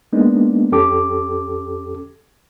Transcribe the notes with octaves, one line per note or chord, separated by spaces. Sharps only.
G#3 A#3 B3 D4 D#4
F2 C#4 G4 A4 D6